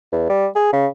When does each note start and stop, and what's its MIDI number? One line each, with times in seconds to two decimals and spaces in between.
0.12 0.29 40
0.29 0.47 55
0.55 0.70 68
0.73 0.87 49